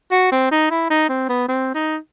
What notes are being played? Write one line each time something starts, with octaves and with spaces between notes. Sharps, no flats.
F#4
C4
D#4
E4
D#4
C4
B3
C4
D#4